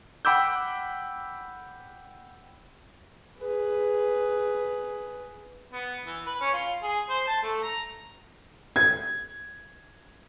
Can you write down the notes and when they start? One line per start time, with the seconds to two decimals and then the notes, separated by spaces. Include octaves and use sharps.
0.25 F#5 G5 B5 D6 E6 G6
3.39 G#4 B4
5.72 B3
6.05 E3
6.26 B4
6.41 C#4
6.53 F4
6.83 G#4
7.09 C5
7.27 A5
7.43 A3
7.62 A#5
8.76 G#6